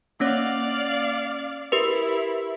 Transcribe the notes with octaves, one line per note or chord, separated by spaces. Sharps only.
A#3 C#4 C#5 D5 F5
E4 G4 A#4 B4